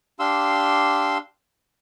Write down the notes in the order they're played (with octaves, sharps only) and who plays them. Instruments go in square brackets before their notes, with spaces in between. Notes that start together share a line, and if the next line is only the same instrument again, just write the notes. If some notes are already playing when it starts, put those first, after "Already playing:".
[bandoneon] D4 G4 F5 C6 E6